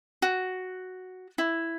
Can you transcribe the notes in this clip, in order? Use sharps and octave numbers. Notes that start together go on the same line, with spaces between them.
F#4
E4